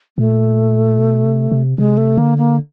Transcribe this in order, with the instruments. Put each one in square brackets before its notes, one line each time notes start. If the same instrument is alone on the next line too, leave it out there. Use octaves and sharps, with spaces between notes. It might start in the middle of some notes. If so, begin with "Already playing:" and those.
[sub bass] A#2 [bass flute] A3
[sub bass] B2
C3
C3
[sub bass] C3 [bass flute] G#3
[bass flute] A3
[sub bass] D3 [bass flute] A#3
[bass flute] A#3